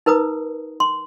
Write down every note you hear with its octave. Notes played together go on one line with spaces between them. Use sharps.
D#4 A#4 B4 A#5 D#6
C6